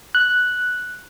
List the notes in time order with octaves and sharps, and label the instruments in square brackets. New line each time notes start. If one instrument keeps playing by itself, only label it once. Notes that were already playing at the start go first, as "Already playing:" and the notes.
[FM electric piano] F#6